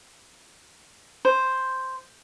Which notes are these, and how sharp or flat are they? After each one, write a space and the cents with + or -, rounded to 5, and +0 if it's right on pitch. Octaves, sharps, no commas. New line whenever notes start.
C5 +0